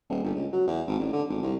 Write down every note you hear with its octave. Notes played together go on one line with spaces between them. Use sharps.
D#1
G1
C#2
F#3
E2
G#1
A1
D3
G#1
C2